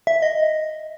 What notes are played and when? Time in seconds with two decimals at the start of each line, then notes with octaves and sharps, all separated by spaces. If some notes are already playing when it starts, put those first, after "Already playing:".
0.07 E5
0.22 D#5